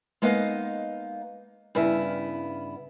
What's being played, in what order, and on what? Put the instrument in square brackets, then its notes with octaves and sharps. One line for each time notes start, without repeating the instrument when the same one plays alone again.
[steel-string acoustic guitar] G#3 A#3 B3 D#4 F5 F#5
G2 C#3 B3 E4